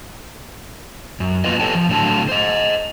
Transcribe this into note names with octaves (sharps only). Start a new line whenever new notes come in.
F#2
F#3 A#3 B3 F4 B4 D#5
G4 A4 B4 C#5 G5 A5
F3
A2 D3 F#3 A5
C5 D#5